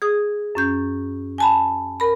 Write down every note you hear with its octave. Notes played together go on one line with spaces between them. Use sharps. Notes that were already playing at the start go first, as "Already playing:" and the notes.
G#4 D#6
F#2 C#4 G6
G#5 A5 B5
A#4 B5